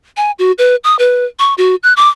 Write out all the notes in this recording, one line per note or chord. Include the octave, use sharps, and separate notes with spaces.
G#5
F#4
B4
D#6
B4
C#6
F#4
F#6
D6